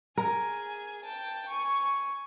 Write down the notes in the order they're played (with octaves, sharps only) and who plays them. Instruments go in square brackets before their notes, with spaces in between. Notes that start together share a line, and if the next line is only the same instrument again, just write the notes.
[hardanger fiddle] G#4 G#5 [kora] A#4
[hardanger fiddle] G5 A5
G#5 C#6